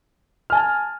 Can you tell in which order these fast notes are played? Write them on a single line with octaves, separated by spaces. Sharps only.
F6 G#5 A5